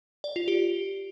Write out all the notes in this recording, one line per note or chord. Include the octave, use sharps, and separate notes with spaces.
D5
F4
G4